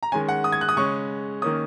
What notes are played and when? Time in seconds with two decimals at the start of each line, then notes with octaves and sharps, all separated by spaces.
0.03 A#5
0.12 D#3 G#3 C#4 G#5
0.28 F#5
0.44 D#6
0.52 G#6
0.61 F#6
0.69 D#6
0.77 C#3 G#3 C#4 C#6
1.42 D#3 A#3 C#4 D#6